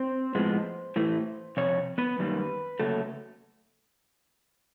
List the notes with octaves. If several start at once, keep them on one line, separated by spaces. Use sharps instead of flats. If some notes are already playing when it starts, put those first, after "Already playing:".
Already playing: C4 C5
A2 F3 G#3 B3
A2 E3 A3
F2 C3 C#5
B3 B4
F#2 D#3 G3 A#3
C#3 F#3 A3 A#3 A4